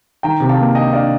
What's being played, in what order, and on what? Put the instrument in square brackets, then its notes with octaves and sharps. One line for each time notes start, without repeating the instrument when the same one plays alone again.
[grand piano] D#3 G5 A#5
C3
F5 A5
A#3
D4 D#5 G5
D4 D5 F5